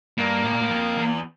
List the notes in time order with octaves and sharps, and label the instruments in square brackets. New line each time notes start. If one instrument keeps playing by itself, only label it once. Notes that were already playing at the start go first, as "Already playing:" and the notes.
[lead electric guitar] G2 [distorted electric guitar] A#3
[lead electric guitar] A2
A#2
A2
F2
E2